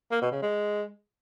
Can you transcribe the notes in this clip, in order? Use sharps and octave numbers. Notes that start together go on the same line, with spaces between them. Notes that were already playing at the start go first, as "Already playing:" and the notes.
A#3
B2
C#3
G#3